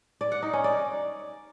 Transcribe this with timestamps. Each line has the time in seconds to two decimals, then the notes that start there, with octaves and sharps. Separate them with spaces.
0.21 D5
0.32 F#5
0.42 D#4
0.53 C#4
0.64 D5